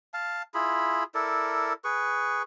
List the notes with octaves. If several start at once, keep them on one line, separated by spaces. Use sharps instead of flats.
F5 A5
E4 F4 G#4 B5
E4 A4 A#4 D5
G#4 B4 C#6